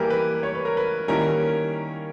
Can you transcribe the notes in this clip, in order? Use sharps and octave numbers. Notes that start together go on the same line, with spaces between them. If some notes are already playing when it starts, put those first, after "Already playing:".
Already playing: E3 G3 A#3 E4 G4 A#4
B4
C#5
B4
A#4
B4
D#3 G3 A#3 C#4 E4 A#4